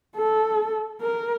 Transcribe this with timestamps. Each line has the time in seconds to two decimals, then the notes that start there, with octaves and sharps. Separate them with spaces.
0.16 A4
1.01 A#4